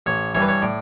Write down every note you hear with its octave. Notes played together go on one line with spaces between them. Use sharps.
A1 C#5
G2 E3 C#5
B4
C#5
A2 D5